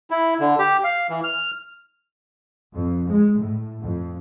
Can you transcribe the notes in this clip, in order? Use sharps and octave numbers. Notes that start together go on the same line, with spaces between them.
E4
D3
G4
F5
E3
F6
F2
G#3
A2
F2